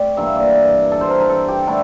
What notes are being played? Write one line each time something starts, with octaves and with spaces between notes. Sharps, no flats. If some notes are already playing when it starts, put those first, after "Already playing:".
Already playing: A3 C4 D5
G2 E3 A#3 E5
D5
A4
C5
A#4
A#4
A4
G4
D3 A3 E4